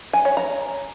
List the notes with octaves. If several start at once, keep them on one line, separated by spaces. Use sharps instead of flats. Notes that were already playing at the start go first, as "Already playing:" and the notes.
G#5
C#5
A#5